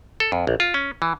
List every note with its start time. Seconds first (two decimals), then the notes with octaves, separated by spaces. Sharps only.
0.20 A4
0.32 F2
0.47 A#1
0.60 F4
0.74 C#4
1.02 E3